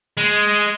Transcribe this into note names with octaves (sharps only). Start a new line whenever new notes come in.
G#3